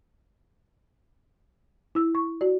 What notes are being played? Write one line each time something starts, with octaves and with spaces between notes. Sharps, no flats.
E4 E6
C#6
F#4 D5